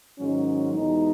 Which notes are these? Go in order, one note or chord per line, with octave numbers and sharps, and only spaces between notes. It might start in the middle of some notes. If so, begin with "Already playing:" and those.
G#2 D#3 F#3 C#4
E2 B2 G#3 D#4